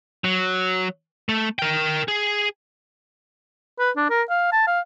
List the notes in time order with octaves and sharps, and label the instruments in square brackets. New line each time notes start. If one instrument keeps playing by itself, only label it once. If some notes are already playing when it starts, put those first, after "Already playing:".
[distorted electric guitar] F#3
A3
A#4 G5
G#4
[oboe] B4
D4
A#4
F5
A5
F5